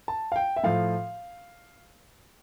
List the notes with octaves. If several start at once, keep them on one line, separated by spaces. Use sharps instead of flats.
A5
F5
G5
E5
A2 F3 F5